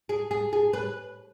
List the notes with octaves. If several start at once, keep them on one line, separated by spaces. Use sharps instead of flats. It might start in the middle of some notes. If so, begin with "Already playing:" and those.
G#4
G#4
G#4
B4